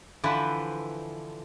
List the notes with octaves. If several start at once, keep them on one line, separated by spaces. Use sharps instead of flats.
D3 E3 F3 E4 B4 C5